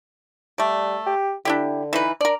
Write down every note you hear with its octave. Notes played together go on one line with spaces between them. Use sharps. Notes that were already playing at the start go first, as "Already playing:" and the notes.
G3 A3 D5
G4
D3 D4 E4 G4
E3 D#4 B4
D4 A#4 D5